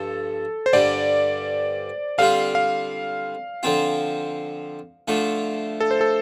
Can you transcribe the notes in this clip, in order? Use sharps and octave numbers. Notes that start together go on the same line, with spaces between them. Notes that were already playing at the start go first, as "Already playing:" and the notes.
Already playing: G2 F3 A4
C5
G2 D3 G3 D5
D3 G3 C4 F4 F5
F5
D3 F3 C4 F4
D3 F3 A3 F4
A4
C5
A4